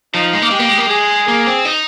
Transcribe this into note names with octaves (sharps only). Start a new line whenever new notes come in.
F3 D#4
G#3
A#3
G#3 G4
A#3
G#3
A#3
G#3 G#4
A#3
C4
D#4